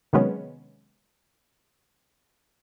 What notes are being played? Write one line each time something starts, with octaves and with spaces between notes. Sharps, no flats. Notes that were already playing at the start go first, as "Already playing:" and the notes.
C3 D#3 F#3 G#3 B3 C#4